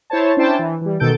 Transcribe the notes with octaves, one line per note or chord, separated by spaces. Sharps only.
E4 C5 C#5 A5
C#4 D4 E4 C5 G5 A5
E3
E3 G3
B2 D#3 A4 G6 A6 D7